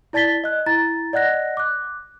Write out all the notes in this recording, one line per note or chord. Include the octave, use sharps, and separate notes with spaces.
E4 D5 A5 A6 B6 G7
D#5 F#6
E4 A#5 A6
D5 D#5 F#5 F#6 A#6
D6 F#6